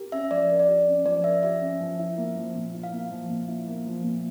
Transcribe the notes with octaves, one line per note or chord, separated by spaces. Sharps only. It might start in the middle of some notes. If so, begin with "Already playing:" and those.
Already playing: G4 A#4
C#4 E5
F3 D5
A#4
D5
G4
C#4
F3 D5
A#4 E5
G4 E5
C#4
F3
E4
A#3
F3
A#2
E4
F5
A#3
F3
A#2
E4
A#3
F3
A#2